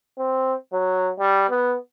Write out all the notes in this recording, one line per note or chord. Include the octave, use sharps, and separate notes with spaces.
C4
F#3
G3
B3